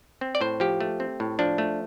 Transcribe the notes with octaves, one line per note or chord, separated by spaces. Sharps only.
C4
D5
A2 C5
F3 G4
A3
C4
A2
F3 D4
A3